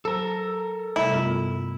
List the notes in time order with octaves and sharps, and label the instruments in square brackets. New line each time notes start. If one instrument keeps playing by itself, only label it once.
[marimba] F#3 C5 A5 [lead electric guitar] A4 A#4
[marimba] C3 G3 A3 [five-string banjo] E4
[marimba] G2 B3 F4